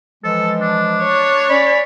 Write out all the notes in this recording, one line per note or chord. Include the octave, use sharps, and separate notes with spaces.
E3 F3 G#3 A4
D4
C#5
C#4 D5 B5